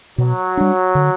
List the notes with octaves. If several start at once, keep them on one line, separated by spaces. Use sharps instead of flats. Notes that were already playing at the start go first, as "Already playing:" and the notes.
B2 F#3
G3 D4
D3